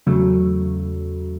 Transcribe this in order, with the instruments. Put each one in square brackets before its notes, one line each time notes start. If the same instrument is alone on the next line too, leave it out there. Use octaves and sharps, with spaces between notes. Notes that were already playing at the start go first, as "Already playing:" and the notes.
[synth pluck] E2 C#3 F#3 A3